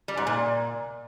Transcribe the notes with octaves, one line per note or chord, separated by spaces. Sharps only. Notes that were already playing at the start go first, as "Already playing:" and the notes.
G3
G#2
A#2